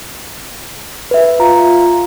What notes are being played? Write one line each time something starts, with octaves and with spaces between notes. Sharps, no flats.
B4 E5
F4 A#5